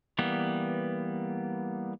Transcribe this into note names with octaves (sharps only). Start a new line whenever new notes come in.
E3 G3 A#3 B3